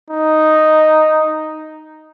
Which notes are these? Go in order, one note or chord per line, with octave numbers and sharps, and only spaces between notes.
D#4